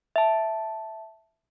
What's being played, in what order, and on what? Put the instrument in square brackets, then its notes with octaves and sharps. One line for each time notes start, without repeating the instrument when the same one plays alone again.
[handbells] E5 A5